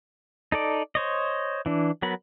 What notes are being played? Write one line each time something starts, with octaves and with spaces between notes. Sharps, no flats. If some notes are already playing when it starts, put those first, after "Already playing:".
D#4 A4 D5
C5 C#5 D#5
E3 D4
F#3 B3 A#4 B5